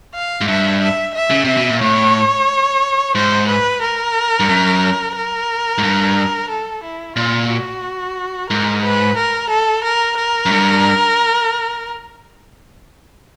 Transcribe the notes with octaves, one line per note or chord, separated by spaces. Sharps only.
F5
G#2
G2 E5
E5
E5
C#3
C3 E5
B2
A#2
A2 C#5
G#2 C5
B4
A#4
G2
F#2
A#4
G#2
G2
A4
E4
A#2 F4
F#4
G#2 A#4
B4
A#4
A4
A#4
A#4
F#2
G2